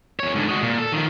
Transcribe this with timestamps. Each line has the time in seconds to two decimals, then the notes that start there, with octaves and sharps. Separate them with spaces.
0.20 E2 C#5
0.35 G#2 D3
0.48 G#3 F#4
0.63 A#2
0.78 A4
0.92 D#3 F3